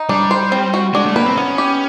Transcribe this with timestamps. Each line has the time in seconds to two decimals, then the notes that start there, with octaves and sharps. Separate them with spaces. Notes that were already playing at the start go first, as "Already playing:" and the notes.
Already playing: D#4
0.09 G3 D4
0.31 C5
0.52 C4
0.74 F#4
0.94 G#3 D4
1.06 A3
1.16 A#3 B4
1.26 C4
1.37 B3 C#4
1.58 G4